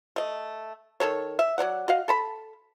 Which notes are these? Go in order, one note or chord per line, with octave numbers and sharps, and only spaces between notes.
A3 D#5
D#3 B3 A4 C#5
E5
F#3 D4 D5 F#5
F#4 D#5 F5
A4 A5 B5